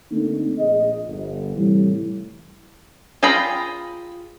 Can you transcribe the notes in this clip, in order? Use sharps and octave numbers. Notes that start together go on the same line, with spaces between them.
D3 A3 A#3 C4 D#4
A#1 G#4 D#5
G1
A2 C3 E3 G3
F4 G#4 G5 A#5 B5